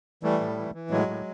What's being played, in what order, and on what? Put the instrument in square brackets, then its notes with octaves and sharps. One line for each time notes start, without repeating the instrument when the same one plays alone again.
[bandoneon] E3 G3 A3
A2
E3
E3
A2 F#3 G#3
A2